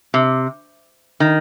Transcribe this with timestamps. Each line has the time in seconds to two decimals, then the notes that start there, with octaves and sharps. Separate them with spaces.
0.14 C3
1.20 D#3